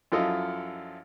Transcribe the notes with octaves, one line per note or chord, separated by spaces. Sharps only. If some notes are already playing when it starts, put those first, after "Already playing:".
F#2 F3 E4 F4 A4 D#5